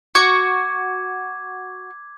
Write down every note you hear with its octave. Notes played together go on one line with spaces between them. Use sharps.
F#4 D6 G#6